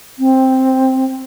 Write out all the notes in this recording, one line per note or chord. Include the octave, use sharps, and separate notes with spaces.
C4